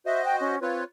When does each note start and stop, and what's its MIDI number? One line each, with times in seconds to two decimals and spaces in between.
0.06 0.55 66
0.06 0.55 72
0.06 0.55 75
0.06 0.24 76
0.25 0.36 79
0.40 0.62 61
0.62 0.83 60
0.62 0.84 65
0.62 0.84 71
0.62 0.84 73